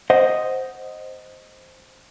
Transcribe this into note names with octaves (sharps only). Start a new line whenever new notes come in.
C5 D#5 F#5